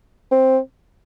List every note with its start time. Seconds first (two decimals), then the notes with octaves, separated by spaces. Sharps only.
0.31 C4